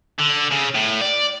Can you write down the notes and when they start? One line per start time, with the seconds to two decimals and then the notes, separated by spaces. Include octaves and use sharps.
0.19 D3
0.52 C#3
0.75 A2
1.01 D5